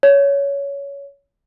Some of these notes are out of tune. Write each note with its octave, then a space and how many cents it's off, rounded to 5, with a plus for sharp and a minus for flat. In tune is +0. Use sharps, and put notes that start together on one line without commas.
C#5 +15